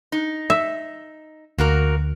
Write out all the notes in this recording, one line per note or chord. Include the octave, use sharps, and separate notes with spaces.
D#4
E5
D2 A#3 F#4 A#4